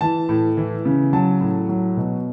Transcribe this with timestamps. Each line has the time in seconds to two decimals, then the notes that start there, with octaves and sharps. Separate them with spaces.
0.01 E3 A5
0.29 A2
0.57 E3
0.85 C#3
1.13 F#3 A5
1.41 A2
1.69 F#3
1.97 B2